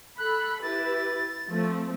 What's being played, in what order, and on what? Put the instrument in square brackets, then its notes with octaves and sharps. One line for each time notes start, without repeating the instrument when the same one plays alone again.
[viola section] A4 B5 [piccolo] F#6
[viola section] E4 G4 B4 [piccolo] A6
[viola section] F3 A3 C4